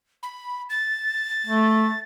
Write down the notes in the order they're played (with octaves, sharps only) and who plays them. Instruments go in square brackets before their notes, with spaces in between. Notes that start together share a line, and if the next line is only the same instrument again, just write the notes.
[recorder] B5
A6
[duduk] A3